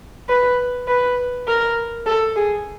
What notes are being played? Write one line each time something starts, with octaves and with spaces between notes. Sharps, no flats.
B4
B4
A#4
A4
G#4